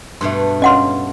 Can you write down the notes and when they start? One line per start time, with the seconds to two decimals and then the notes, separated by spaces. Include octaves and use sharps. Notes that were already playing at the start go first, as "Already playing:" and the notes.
0.21 G2 B2 A3 E5 C6
0.62 C#4 D#5 F5 F#5 C6